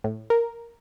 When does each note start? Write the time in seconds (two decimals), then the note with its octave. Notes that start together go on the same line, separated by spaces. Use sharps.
0.04 A2
0.30 A#4